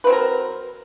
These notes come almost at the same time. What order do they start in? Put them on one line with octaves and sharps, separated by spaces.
B4 C4 F#3 A#4